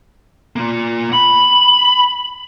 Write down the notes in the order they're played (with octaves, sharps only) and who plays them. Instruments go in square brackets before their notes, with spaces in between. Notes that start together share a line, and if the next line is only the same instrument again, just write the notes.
[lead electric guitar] A#3 F4
[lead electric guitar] B5 [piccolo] F#7